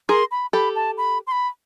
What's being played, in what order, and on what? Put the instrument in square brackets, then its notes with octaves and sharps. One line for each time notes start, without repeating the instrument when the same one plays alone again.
[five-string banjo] G#4 A#4 [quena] C6
[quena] B5
[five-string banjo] G4 A4 [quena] B5
[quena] A5
B5
C6
B5